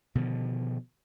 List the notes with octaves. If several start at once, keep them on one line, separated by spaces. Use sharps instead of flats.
B2 D3 D#3 F3